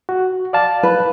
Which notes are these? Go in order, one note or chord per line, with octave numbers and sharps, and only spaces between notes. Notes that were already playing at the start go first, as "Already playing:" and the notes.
F#4
D5 F5 A5
B4